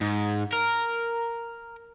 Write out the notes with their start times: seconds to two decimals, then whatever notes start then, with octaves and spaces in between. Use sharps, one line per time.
0.01 G#2
0.53 A#4